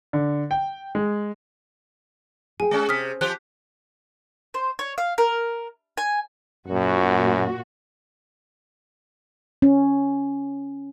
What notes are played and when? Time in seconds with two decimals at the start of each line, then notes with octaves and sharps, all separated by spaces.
0.13 D3
0.51 G5
0.95 G#3
2.60 G#4 G5 G#5
2.71 G#3 C#4
2.89 C3 D#6 F6 B6
3.21 F3 G4 C5 F#6
4.54 C5
4.79 C#5
4.98 F5
5.18 A#4
5.98 G#5
6.68 F#2 A#2 F#4
9.62 C#4